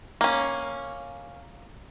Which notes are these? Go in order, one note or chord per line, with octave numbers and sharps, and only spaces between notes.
A#3 C#4